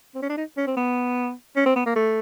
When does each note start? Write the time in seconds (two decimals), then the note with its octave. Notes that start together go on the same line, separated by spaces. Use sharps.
0.15 C4
0.22 C#4
0.29 D4
0.37 D#4
0.57 C#4
0.67 C4
0.77 B3
1.56 C#4
1.66 C4
1.76 B3
1.86 A#3
1.96 A3